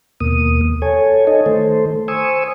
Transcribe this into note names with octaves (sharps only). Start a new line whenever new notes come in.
D#2 B2 A#3 D#6
A4 C#5 G#5
D#4 A4 C#5 D#5
D#3 A3 A4 C5
C5 G#5 C#6 D#6 E6